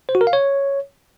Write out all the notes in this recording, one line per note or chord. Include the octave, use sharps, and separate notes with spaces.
C5
F#4
A#4
F5
C#5